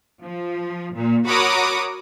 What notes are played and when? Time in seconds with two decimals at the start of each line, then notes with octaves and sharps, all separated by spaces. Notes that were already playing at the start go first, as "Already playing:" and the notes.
0.23 F3
0.94 A#2
1.27 F#4 A#4 C#5 B5 D6 D#6